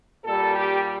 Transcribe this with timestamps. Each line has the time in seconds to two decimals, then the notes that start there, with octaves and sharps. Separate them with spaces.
0.24 A#2 G3 A4
0.54 G4